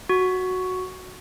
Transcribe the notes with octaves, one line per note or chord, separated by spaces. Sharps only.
F#4